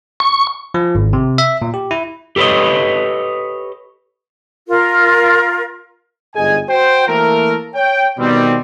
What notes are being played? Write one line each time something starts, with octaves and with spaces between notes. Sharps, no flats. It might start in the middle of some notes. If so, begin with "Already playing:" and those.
C#6
F3
G#1
C3
E5
A#2
G4
E4
G4 A4 B4 C#5 D#5
F4 A#4
G1 G#2 G#4 D#5 G#5
F#4 C5 G5
E3 A3 A#3 E4 A4 A#4
C#5 G5
B2 D#3 G3 C4